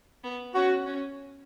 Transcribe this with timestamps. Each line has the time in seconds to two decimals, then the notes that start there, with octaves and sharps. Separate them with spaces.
0.24 B3
0.55 C#4 F#4
0.86 C#4